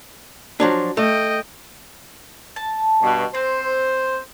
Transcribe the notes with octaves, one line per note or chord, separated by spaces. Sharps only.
F3 F#3 D4
A3 D#5 G5
A5
G2 B2
C4 C5